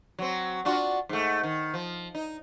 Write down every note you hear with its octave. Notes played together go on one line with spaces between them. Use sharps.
F#3 C4
D4 F4 F#4
G#2 A3
D#3
F3
D#4